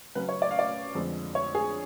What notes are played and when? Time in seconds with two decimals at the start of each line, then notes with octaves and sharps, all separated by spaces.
0.15 C#3 F#3 C#4 B4
0.29 C#5
0.42 D5
0.51 F5
0.59 D5
0.95 F2 D3 G#3 D4
1.35 C#5
1.55 G#4